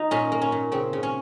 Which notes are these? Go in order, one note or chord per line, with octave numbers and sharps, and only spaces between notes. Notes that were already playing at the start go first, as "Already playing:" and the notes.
Already playing: D#4 F4
A#2 C#4
A#3
C#4
A#2
C#3 C4
C#3
C#4